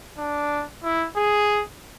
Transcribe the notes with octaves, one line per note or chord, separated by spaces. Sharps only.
D4
E4
G#4